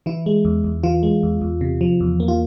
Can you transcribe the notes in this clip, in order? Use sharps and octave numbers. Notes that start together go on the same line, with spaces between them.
E3 E4
G#3
E2
E2
E3 F4
G#3
E2
E2
C3
F3
E2
A#3
F4